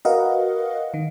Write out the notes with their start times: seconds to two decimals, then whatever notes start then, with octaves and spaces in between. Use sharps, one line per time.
0.05 F#4 A#4 B4 D#5 F5 F#5
0.94 D#3